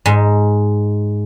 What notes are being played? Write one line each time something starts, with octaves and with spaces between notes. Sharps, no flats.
G#2